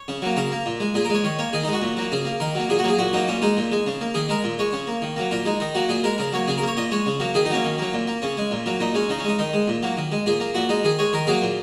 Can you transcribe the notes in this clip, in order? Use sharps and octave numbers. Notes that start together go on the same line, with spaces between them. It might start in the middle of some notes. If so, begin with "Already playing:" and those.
Already playing: C#5
C#3
F#3 A#3
C#3 A#4
A#3
A#2
G#3
A#2 G#4
A#4
G#3 C#5
D#3 C#5
A#3 C#5
D#3 G#4
D#4
G#3
F#4
A#2
F#3 A#3
C#3 G#4
A#3
D#3 A#4
F#3 A#3
A#2 G#4
F#4
F#3 A#3 G#4
A#2 F#4
F#3 A#3 D#4
A#2 C#4
G#3 D#4
A#2
G#3
C#3
A#3
D#3 G#4
G#3 A#4
A#2
G#3 C#5
C#3
A#3
D#3
F#3 A#3
A#2 A#4
G#3 D#4
D#3 D#4
F#3 A#3 F#4
A#2 G#4
G#3 A#4
C#3 A#4
F#3 A#3 C#5
C#3 G#4
A#4
A#3
C#5
A#2 D#5
G#3 C#5
C#3
F#3 A#3
D#3 G#4
D#4
F#3 A#3 C#4
D#3
F#3 A#3
A#2
A#3
C#3 C#4
G#3
A#2
F#3 A#3
A#2 D#4
G#3 C#4
C#3 D#4
C#4
G#3 D#4
D#3 D#4
G#3
A#2
F#3 A#3
D#3
G#3
A#2 G#4
A#3
A#2 F#4
G#3 D#4
D#3 G#4
G#3 C#5
D#3 A#4
F#3 A#3 G#4
A#2